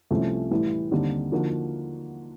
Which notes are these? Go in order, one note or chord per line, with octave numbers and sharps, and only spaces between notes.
C2 C3 F3 A3 C#4
A2 E3 G3
D#2 D3 G3 C4 D#4
D3 F3 A#3 D#4 F#4